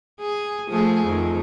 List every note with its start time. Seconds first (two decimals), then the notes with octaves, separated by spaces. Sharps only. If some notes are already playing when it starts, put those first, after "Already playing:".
0.21 G#4
0.69 F3 A3 G#4
1.05 F2 D#3